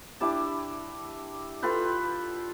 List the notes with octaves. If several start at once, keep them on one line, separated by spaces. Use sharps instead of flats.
D4 E4 G4 A5
F4 A4 B4 G5